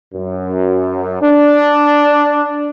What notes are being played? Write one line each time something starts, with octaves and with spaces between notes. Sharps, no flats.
F#2
D4